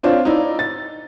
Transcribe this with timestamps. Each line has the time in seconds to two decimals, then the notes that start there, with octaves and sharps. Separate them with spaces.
0.03 C4 D4 F4 C5 C#5
0.25 D#4 E4 D5
0.59 A6